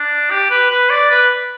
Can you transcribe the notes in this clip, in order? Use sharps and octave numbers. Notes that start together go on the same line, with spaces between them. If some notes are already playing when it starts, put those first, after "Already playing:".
Already playing: D4
G4
B4
B4
D5
B4